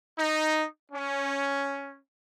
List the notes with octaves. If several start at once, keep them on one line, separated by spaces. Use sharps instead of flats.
D#4
C#4